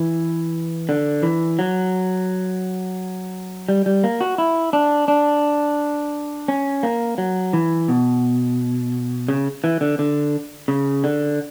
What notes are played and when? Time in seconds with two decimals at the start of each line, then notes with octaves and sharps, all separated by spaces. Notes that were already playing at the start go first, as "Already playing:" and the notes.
Already playing: E3
0.89 D3
1.23 E3
1.59 F#3
3.69 G3
3.86 G3
4.04 A#3
4.21 F#4
4.38 E4
4.73 D4
5.08 D4
6.48 C#4
6.83 A#3
7.18 F#3
7.53 E3
7.88 B2
9.29 C#3
9.64 E3
9.81 D3
9.99 D3
10.68 C#3
11.04 D3